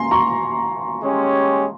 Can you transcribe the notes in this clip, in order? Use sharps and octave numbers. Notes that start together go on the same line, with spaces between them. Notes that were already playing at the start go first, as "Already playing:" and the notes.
Already playing: G#5 A#5 C6
A#5 C#6
G#3 C#4 G4 C#5